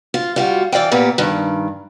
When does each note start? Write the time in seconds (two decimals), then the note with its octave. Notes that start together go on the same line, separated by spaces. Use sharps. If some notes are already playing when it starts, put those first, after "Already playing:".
0.14 F4
0.36 G3 F4 F#4
0.72 E3 D5 F5 G5
0.92 A#2 A#3 B3 G4
1.18 G2 D#3